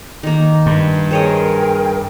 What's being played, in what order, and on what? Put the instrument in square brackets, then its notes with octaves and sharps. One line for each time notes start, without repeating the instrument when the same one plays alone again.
[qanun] D#3 A#3
[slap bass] G2
[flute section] G#4 A#4 G5 [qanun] C5 C#5 D#5